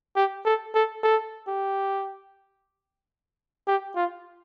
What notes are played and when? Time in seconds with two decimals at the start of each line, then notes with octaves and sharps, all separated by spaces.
0.16 G4
0.45 A4
0.75 A4
1.03 A4
1.48 G4
3.67 G4
3.96 F4